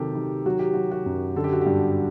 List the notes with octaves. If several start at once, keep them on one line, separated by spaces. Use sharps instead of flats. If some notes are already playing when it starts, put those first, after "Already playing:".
Already playing: C3 D#3 F#3 G4 A4
D#3
F#3 F#4
G4
F#3 F#4
F#4
F#2
D3 A4
G4
F#4
G2 G4